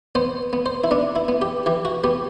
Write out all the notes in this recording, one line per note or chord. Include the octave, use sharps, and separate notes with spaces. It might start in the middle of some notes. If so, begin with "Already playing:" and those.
B3 C5
B3
C5
E4
B3 D4
E4
B3
G4
E3 G4
F#4
B3 G4